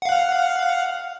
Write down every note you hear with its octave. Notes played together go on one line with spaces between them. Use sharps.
F5 F#5